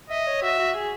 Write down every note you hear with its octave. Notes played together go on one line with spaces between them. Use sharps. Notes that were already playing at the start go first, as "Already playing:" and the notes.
D#5 E5
C#5
F#4 E5
F#4
G#4